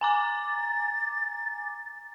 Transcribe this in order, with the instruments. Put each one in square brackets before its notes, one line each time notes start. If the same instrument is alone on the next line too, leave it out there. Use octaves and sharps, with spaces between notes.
[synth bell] G#5 A#5 D6 [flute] A6